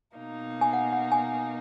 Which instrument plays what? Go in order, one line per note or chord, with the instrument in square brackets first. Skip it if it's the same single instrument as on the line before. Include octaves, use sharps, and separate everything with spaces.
[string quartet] B2 A#3 D#4
[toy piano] G#5
F#5
F#5
G#5